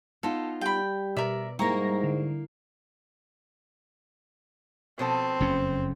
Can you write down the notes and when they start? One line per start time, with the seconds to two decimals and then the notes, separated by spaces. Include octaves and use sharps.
0.23 B3 D#4 F4 A4
0.61 G3 G5 B5
1.17 B2 A#4 D5 E5
1.59 G#2 G3 A#3 E4 A#5 C#6 A#6
2.03 D3
4.99 B2 F3 C4 A4
5.40 F#1 F2 C#4